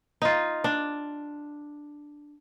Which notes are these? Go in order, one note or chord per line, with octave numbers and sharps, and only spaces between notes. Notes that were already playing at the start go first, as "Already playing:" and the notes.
D#4 F4
D4